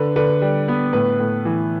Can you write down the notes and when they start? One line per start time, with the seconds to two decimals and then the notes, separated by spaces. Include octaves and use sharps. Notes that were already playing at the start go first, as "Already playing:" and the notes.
Already playing: D3 B4
0.16 D3 B4
0.42 G3
0.68 B3
0.93 A2 B4
1.20 A2
1.45 E3